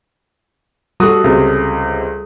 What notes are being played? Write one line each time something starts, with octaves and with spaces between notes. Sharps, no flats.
G3 F#4 A4 D#6
C#2 C3